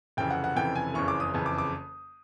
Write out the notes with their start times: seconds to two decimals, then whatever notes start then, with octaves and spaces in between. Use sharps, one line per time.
0.17 F1 F2 C#3 E3 G5
0.30 F#5
0.44 F#5
0.55 F1 F2 C#3 E3 G5
0.75 G#5
0.94 F#1 F2 C#3 E3 C#6
1.08 D6
1.20 D#6
1.33 F#1 F2 C#3 E3
1.46 D6
1.58 D6